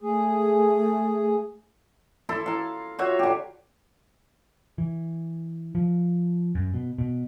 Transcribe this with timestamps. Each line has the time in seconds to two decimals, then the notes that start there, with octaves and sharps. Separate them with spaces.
0.01 A3 G#4
2.29 E4 A4 C6
2.46 F5 A#5
2.99 F4 F#4 C#5 E5
3.19 D3 G4
4.78 E3
5.75 F3
6.55 F#2
6.74 B2
6.98 B2